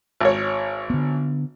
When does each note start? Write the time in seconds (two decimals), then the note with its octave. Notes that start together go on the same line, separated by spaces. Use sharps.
0.21 G#1 C#5
0.90 D3 B3